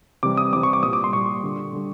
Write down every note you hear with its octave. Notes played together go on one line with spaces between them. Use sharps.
C3 E3 G3 D6
D#6
C3 E3 G3 D6
C#6
D6
A#2 G3 D#6
D6
C6
A#2 G3 C#6
D3 G3
D3 G3